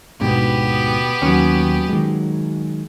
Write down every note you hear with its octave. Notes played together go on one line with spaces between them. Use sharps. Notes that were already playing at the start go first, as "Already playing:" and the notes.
D2 G#2 B2 D3 B3 G4
D#2 F#3 C#4
D#3 G#3